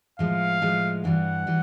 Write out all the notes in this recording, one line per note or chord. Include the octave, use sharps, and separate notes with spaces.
A2 F3 G#3 F5
A2 F3 G#3
G2 E3 G3 F#5
E3 G3